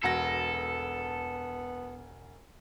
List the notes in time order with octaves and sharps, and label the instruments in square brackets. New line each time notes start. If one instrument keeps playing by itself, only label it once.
[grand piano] E1 F#4 A#6 [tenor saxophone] B3 [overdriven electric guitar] A4